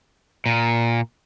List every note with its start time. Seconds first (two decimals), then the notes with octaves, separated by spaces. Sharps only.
0.46 A#2